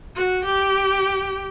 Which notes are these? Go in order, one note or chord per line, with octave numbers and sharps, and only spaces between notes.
F#4
G4